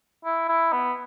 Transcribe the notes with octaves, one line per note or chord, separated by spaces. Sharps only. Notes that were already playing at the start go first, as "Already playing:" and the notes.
E4
E4
B3